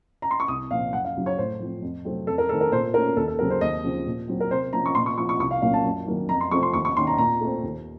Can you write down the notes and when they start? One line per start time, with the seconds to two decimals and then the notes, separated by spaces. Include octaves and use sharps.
0.22 A#5
0.31 C6
0.40 C#6
0.48 C2 D#6
0.71 A#2 F3 C4 F5
0.93 F#2 F#5
1.05 F5
1.15 C#3 F#3
1.26 C#5
1.38 A2 C5
1.60 F3 C4
1.82 F2
2.05 C3 F#3 A3 C4
2.27 F2 A4
2.38 A#4
2.49 D#3 A3 C4 A4
2.61 A#4
2.72 A#2 C5
2.94 A3 A#4
2.97 C#4
3.17 D#2 A4
3.28 A4
3.39 C#3 F#3 C4 A#4
3.50 C5
3.61 D#2 D#5
3.84 C#3 F3 C4
4.06 A#2
4.28 F#3 C4
4.40 A#4
4.51 C3 C5
4.73 F3 A#3 C#4 A#5
4.86 C#6
4.95 A#2 C6
5.06 C#6
5.18 F3 C4 C#6
5.29 C#6
5.39 C2 C#6
5.51 F5
5.62 A#2 F#3 A#3 C#4 F5
5.73 A5
5.85 F#2
6.07 D#3 F#3 A#3 C#4
6.29 F2 A#5
6.41 C6
6.51 C3 F3 A3 C4 C#6
6.63 C6
6.73 D#2 C#6
6.85 C#6
6.96 D#3 A#3 C#4 C6
7.07 A#5
7.18 A#2 A#5
7.41 A3 C4
7.63 D#2